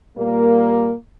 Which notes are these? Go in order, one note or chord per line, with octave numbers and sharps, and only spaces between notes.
A#2 G3 A#3